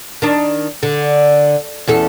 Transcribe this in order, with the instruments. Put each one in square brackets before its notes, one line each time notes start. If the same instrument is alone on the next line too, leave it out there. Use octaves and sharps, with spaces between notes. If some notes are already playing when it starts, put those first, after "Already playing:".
[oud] D#3 D4
D3
E2 C#4 A4